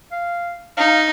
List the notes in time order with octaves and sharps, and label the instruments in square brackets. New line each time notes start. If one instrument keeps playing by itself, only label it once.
[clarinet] F5
[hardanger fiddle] D#4 [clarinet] F5